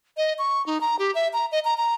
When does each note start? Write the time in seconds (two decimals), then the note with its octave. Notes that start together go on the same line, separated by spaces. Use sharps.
0.17 D#5
0.38 C#6
0.66 D#4
0.81 A#5
0.99 G4
1.15 E5
1.33 A#5
1.52 D#5
1.65 A#5
1.77 A#5